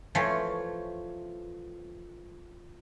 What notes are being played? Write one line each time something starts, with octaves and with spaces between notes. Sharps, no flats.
E3 F3 A3 C#5